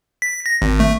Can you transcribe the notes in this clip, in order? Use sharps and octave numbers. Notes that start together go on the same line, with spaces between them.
B6
A#6
G#1
A3